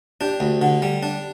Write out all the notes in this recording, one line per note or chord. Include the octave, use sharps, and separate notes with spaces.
D4 G4
D2
D3
G3
D4